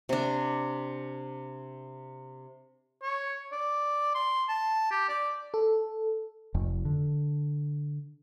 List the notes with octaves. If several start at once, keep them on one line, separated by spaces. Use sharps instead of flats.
C3 D4
C#5
D5
C6
A5
G4
D5
A4
F1 F2
D3